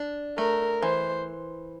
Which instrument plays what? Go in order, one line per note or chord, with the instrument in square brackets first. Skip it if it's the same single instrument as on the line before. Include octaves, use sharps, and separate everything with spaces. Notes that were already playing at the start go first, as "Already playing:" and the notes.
Already playing: [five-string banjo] D4
[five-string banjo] A3 [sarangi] A#4
[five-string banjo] E3 [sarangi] C5